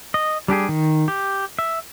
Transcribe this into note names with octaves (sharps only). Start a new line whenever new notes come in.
D#5
G3 D4 G4 G#4
D#3
G4
E5